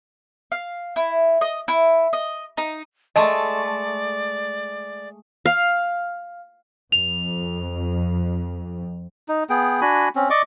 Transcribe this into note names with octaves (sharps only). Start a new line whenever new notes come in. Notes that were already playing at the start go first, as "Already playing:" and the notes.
F5
E4
D#5
E4
D#5
D#4
G#3 A3 D5 D#5 A5
F5
F2 F7
D#4
B3 G#4 G5
D4 F#4 G#5 B5
C4 C#4
D5 D#5 C#6 D6